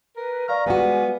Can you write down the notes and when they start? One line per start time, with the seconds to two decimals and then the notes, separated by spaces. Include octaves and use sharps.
0.16 A#4 B4
0.48 D5 F5 A#5 C#6 F6
0.66 G3 G#3 B3 F#4 G#5